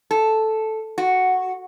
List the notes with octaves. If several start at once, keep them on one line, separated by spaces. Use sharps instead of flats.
A4
F#4